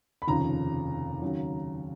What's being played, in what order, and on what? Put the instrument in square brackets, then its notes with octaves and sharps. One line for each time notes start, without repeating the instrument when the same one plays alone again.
[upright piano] B5
F1 D#2 C#3 F3 A#5
D#2 C#3 F#3